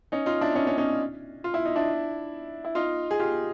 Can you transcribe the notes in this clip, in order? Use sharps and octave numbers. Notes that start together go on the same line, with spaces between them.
C#4 D#4
D#4 F4
D4 E4
C#4 D#4
C#4 D#4
C#4 D#4
F4
E4
D#4
D4 E4
E4
D#4 F4
G#4
F4 G4